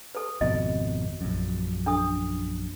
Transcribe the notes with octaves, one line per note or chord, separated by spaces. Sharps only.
A4 B4
G#1 F2 B2 D#5
A#1 F#2
D4 A4 D#6